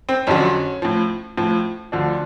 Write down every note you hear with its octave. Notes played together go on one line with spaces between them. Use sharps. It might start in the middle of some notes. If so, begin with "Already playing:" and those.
C4
F2 D3 F#3 C#4
A2 F3
A2 F3
D2 D3 F3 D4